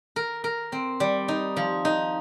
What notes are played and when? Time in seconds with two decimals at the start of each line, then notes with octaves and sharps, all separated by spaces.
0.16 A#4
0.44 A#4
0.72 C4
1.00 G3
1.28 D#4
1.57 F3
1.85 D#4